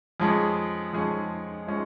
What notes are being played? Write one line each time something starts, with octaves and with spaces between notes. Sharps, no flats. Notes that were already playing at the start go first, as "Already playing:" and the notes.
F2 F3 G#3 C#4 G#4
F2 F3 G#3 C#4 G#4
F3 G#3 C#4 G#4